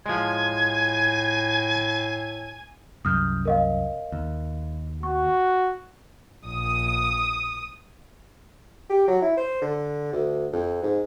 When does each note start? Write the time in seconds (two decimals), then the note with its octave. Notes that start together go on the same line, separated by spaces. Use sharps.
0.06 A2 F3 G#3 G#5 G#6
3.05 C2 F#2 D#6 F6 G6
3.45 A#4 D#5 F5
4.12 D#2
5.03 F#4 C#6
6.45 A#1 D#6
8.90 G4
9.08 F#3
9.22 E4
9.37 C5
9.62 D3
10.13 D2
10.53 F2
10.83 G#2